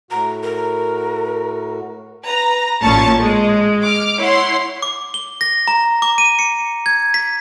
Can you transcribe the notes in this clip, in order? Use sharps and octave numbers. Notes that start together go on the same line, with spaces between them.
A2 F#4 A#5
A#4
B4 A#5 A#6
A1 A#2 C#4 A5 C#6
G#3
D6 F6
E4 C#5 F#5 C6
D6
G7
A#6
A#5
D6
D#7
C#7
G#6
B6